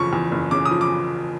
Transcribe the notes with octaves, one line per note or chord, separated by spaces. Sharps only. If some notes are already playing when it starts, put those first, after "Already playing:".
Already playing: F#1 E2 C#3 F3 C#6
E2
F#1
C#3 D6
D#6
F3
D6